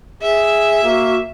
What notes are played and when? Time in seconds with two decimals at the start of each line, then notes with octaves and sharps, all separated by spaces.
0.22 G#4 E5
0.84 A#3 F#4